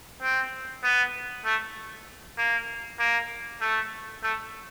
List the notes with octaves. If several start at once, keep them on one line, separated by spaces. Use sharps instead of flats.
C4
B3
A3
A#3
A#3
A3
A3